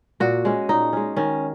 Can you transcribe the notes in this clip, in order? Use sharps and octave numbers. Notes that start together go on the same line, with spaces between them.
A#2 F#4
G#3 C#4
A#2 D#4
G#3 C#4
D#3 C#4